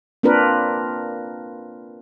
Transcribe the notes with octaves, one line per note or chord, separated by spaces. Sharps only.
A#3 C4 D4 F4 A#4 B4